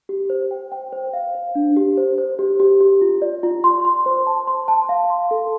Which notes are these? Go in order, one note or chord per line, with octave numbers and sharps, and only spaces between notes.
G4
C5
G5
G5
C5
F5
C5
D4
G4
C5
C5
G4
G4
G4
F4
D5
F4
C6
C6
C5
A5
C6
A5
F5
C6
A4